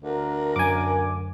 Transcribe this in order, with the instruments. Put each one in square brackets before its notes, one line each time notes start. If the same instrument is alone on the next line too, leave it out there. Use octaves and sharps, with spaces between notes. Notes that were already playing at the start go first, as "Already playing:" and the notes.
[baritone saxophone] D2 [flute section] A#4
[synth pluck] F#2 [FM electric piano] G#5 D6